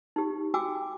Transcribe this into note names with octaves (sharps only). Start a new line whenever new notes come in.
D#4 G4
F#4 G5 G#5 D6 E6